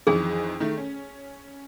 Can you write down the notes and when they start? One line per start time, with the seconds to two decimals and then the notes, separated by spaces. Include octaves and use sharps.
0.07 F2 D#3 E3 G#4
0.60 D#3 A3
0.77 C#4